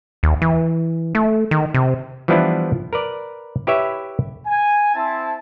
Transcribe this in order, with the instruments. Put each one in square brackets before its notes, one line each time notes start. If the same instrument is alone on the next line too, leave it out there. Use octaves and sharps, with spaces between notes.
[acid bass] D#2
E3
A3
D#3
C3
[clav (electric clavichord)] E3 F3 G3 B3 D4 E4
A#4 B4 D5
E4 G4 B4 C#5 E5
[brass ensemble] G#5
C4 E4 A5